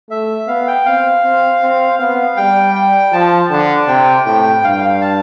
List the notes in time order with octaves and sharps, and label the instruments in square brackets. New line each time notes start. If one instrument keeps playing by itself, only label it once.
[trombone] A3 [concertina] E5
[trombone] B3 [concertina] F5
[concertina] G5
[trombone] C4 [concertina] F5
[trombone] C4
C4
[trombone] B3 [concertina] F5
[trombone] G3 [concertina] G5
[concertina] G5
[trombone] F3 [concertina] A5
[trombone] D3 [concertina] A5
[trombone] C3 [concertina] G5
[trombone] A2 [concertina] G5
[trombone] G2 [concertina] F5
[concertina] G5
F5
A5